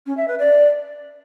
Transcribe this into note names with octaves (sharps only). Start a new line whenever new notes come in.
C#4
E5
B4
D5